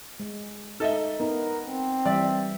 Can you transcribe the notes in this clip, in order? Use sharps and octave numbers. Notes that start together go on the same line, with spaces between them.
G#3
D#4 A4 D#5 E5
B3 D#4 A#4
C4
E3 G3 D5 E5